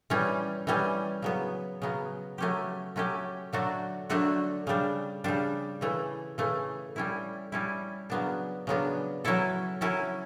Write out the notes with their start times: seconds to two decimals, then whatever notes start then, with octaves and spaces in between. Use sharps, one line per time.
0.10 E3 G3 C#4
0.67 E3 G3 C#4
1.22 C#3 F#3 B3
1.82 C#3 F#3 B3
2.38 F#3 A3 C#4 G4
2.96 F#3 A3 C#4 G4
3.53 D3 F#3 A3 D4 F#4
4.10 D3 F#3 A3 D4 F#4
4.67 C#3 G3 D4
5.24 C#3 G3 D4
5.81 C#3 E3 A3
6.38 C#3 E3 A3
6.96 G3 C#4 E4
7.52 G3 C#4 E4
8.10 C#3 F#3 B3 D4
8.67 C#3 F#3 B3 D4
9.25 F#3 C#4 E4 A4
9.81 F#3 C#4 E4 A4